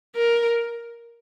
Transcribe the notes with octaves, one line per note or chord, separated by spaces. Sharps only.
A#4